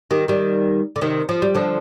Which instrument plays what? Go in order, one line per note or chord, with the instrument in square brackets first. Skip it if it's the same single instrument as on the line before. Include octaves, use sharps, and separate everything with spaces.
[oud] D#3 G3
D#3 G3
D3
C3 D#3
F3
G3
D3 F3